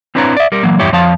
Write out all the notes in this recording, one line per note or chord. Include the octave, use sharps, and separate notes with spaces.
C4 D4 E4 B4 C#5 A#5
D5 E5
G3 A#4
E3 F#3 A#3
E2 G2 E4 G4 C#5
F2 F3 C#5 F5 A5